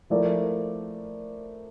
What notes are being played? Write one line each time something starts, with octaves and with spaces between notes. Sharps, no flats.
F3 A3 E4 A#4 D5